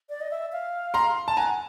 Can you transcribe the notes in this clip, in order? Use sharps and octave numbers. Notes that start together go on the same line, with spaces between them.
D5
D#5
E5
F5
A#5 C6
A5
F#5 G#5 A#5